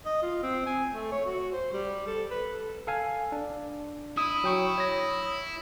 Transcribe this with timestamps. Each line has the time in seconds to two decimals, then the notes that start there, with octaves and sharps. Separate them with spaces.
0.06 D#5
0.22 F4
0.43 C4
0.66 G#5
0.92 A3
1.11 C#5
1.26 F#4
1.52 C5
1.73 G3
2.07 A4
2.31 B4
2.50 A4
2.87 A4 F5 G#5
3.32 D4
4.17 E4 D#6
4.44 F#3 G5 C#6
4.78 C#5 A#6